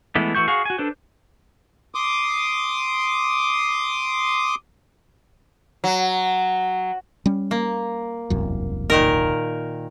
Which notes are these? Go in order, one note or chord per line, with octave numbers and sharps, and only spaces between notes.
E3 G#3 A3 B3 E4
E3 A3 F#4 C#6 G6
F#4 G#4 F5 C#6
F#4 G#5
D4 A4 B4 C5
C6 D6 D#6
F#3
G3 C#4
A#3
E1 C2 F#2
A#2 D#3 A#4